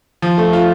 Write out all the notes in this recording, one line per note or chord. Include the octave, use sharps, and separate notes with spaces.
F3
A3
F4